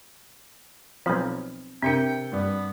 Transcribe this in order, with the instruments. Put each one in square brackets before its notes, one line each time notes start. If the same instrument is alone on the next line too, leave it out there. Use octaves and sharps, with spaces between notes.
[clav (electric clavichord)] B1 F3 [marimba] C4 B5
[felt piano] C3 C#7 [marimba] C4 D4 A#4 [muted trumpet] G5
[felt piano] G2 [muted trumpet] B3